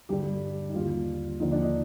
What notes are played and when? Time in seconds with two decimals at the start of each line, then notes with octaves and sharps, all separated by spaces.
0.09 G2 D3 G3 G4
0.69 D#4
0.74 D#2 D3 G3 F4
1.40 D#2 D3 F3 D#4
1.51 D4
1.62 D#4